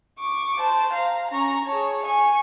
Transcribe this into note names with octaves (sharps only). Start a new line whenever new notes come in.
C#6 D6
C5 A5
F5 A#5
C#4 A#5 C#6
G#4 C#5 A5
G#5 C#6